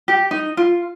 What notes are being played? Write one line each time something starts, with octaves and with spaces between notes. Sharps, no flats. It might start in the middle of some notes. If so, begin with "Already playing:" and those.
G4
D#4
F4